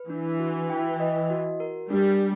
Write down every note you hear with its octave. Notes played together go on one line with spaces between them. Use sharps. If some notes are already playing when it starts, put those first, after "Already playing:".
Already playing: B4
E3 D4
F#4
G5
D#5
F#4
A#4
G3 D4